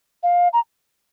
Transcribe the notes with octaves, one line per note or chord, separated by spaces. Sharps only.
F5
A#5